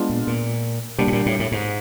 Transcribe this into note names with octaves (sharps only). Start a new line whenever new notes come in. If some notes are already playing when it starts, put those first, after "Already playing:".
Already playing: G#3 B3 D4 F4
A#2
A#2
B2 G3 A#3 D4 G4
A2
A#2
A2
A2
G#2